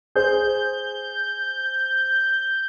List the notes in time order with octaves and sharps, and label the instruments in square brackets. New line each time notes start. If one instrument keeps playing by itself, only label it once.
[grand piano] G#4 C5 [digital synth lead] G6